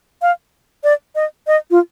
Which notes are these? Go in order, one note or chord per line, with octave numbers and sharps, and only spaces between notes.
F5
D5
D#5
D#5
F4